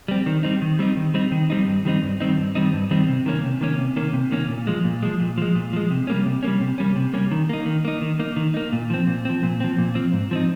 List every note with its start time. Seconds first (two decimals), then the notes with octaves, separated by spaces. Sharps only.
0.08 G3 C4
0.26 D#3
0.43 G3 C4 D#4
0.62 D#3
0.79 G3 C4 D#4
0.97 D#3
1.14 G3 C4 D#4
1.32 D#3
1.50 G3 C4 D#4
1.66 G2
1.85 D#3 G3 C4 D#4
2.02 G2
2.20 D#3 G3 C4 D#4
2.37 G2
2.55 D#3 G3 C4 D#4
2.73 G2
2.91 D#3 G3 C4 D#4
3.08 C3
3.26 D#3 A#3 C#4
3.44 C3
3.61 D#3 A#3 C#4
3.78 C3
3.96 D#3 A#3 C#4
4.13 C3
4.32 D#3 A#3 C#4
4.49 A#2
4.67 F3 G#3
4.84 A#2
5.03 F3 G#3
5.20 A#2
5.38 F3 G#3
5.55 A#2
5.73 F3 G#3
5.91 C3
6.07 G3 A#3 C#4
6.26 C3
6.43 G3 A#3 C#4
6.61 C3
6.78 G3 A#3 C#4
6.96 C3
7.13 G3 A#3 C#4
7.31 D#3
7.49 A#3 D#4
7.66 D#3
7.85 A#3 D#4
8.01 D#3
8.19 A#3 D#4
8.36 D#3
8.54 A#3 D#4
8.73 A#2
8.90 F3 C4
9.07 A#2
9.25 F3 C4
9.43 A#2
9.60 F3 C4
9.78 A#2
9.95 F3 C4
10.13 G#2
10.31 F3 C4 D#4